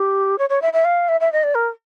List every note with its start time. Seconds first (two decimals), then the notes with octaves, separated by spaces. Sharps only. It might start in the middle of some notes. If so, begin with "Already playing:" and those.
Already playing: G4
0.38 C#5
0.50 C#5
0.62 E5
0.73 E5
0.85 F5
1.09 E5
1.20 E5
1.32 D#5
1.43 D5
1.55 A#4